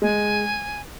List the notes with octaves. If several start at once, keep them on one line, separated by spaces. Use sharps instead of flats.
G#3 G#5